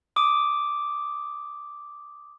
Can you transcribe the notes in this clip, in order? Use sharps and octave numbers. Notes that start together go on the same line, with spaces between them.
D6 D#6